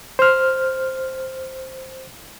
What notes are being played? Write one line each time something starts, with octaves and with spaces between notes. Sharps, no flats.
C5 F6